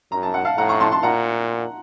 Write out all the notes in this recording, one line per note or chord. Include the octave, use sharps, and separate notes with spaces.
F#2 A#5
A5
F#5
F5 A5
A2 F#5 A#5
A#5 C#6
A5 C6
A5 C6
A#2 F#5 A#5